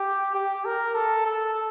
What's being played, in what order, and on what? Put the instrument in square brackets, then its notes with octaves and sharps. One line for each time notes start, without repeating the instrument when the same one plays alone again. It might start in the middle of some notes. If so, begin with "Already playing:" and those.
Already playing: [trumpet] G4
G4
A#4
A4
A4